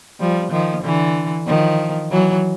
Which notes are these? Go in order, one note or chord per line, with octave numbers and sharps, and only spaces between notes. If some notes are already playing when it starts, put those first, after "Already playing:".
F3 G3
D#3 F3
D3 E3
D#3 F3
E3 F#3